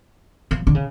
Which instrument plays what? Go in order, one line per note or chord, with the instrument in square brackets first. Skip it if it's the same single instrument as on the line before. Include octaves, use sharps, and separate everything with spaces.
[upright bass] F3
D3
C#3